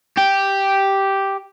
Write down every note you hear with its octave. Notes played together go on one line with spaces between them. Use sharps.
G4